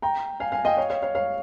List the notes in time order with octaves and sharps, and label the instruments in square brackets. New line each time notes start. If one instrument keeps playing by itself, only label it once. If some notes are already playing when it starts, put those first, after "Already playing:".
[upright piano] G5 A#5
F5 G#5
F5 G#5
D#5 G5
C#5 F5
C#5 F5
C#5 F5
C#5 F5